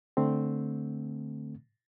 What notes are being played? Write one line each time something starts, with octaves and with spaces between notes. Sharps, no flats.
D3 A3 C4